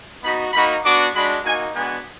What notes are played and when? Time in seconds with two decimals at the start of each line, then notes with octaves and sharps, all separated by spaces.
0.23 B3 D#4 F#4 B5
0.53 A#3 D#4 F#4 B5
0.84 B3 D4 F#4 D6
1.15 G#3 D4 F#4 B5
1.44 A#3 D#4 F#4 G#5
1.74 G#3 B3 D4 F#4 G#5